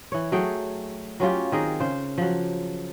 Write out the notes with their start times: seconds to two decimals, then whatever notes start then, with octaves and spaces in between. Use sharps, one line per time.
0.12 E3 C#5
0.32 F#3 A3 G#4 G5
1.20 F#3 C#4 F4 G4
1.52 D#3 C4 G#4 A#4
1.80 C#3 C5
2.18 F3 F#3